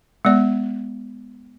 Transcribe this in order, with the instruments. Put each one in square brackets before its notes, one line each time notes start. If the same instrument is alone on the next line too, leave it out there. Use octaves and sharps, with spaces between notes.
[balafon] G#3 B3 D5